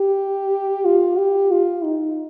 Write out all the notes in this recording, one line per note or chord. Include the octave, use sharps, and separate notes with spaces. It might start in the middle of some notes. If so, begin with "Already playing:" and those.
Already playing: G4
F4
G4
F4
D#4